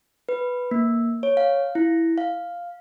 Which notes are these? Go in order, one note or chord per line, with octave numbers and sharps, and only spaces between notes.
B4
A#3
C#5
F5
E4
F5